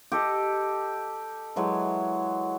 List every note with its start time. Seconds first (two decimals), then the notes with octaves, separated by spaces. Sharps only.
0.12 G4 A4 D#5
1.56 E3 F#3 G#3